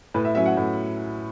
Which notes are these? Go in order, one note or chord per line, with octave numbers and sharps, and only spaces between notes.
A2 B4
E5
F#3 C#4 E5
F#5
A2